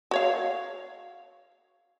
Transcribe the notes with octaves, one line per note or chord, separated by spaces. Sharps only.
F#4 C#5 F5